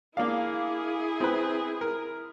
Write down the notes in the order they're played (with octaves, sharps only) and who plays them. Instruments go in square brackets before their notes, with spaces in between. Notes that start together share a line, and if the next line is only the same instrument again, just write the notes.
[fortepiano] A#3 D4 F5 [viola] E4 G#4
[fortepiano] C4 B4
A#4